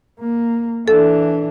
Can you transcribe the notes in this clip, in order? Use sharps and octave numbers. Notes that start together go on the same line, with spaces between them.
A#3
E3 D4 A4